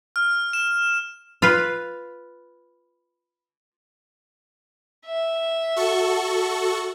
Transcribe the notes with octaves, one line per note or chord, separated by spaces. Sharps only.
F6
E7
F4 B4
E5
F#4 A4 C#6